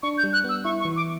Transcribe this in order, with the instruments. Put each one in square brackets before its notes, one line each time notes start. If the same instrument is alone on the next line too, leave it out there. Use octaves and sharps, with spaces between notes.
[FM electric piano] D4 [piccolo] C#6
[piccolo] G6
[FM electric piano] G3
[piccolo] F#6
[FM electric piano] B3 [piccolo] E6
[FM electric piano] E4 [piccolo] C#6
[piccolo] C#6
[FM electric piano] E3
[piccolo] D6